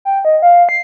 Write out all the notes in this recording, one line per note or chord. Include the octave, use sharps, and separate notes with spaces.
G5
D#5
F5
C7